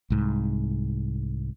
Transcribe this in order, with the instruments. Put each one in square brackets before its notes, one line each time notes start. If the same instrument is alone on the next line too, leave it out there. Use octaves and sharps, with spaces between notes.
[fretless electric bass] C2 G#2